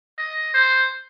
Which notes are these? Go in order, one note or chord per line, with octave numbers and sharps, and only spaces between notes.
D#5
C5